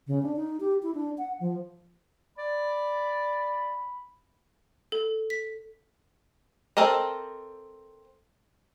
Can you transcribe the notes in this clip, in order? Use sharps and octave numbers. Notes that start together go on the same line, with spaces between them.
C#3
D4
D#4
G4
E4
D4
F#5
F3
D5 B5
A4
B6
C4 A4 A#4 D#5